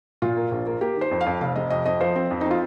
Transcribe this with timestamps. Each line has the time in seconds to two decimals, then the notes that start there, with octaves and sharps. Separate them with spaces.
0.22 A#2 F4
0.37 A#3
0.51 A#1
0.66 A#3
0.81 A#3 G4
0.96 D#3 C5
1.11 F2
1.21 F5
1.26 F2
1.41 F1 F5
1.56 C3 D#5
1.70 F2 D#5
1.86 F2 D#5
2.01 F3 C5
2.16 C4
2.31 F2
2.41 D#4
2.46 C4
2.51 F4